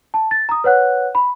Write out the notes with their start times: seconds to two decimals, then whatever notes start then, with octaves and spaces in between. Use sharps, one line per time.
0.14 A5
0.31 A6
0.49 A#5 D#6
0.64 B4 C#5 F#5 F#6
1.15 B5